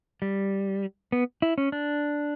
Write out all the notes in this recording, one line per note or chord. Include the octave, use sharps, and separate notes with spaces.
G3
B3
E4
C#4
D4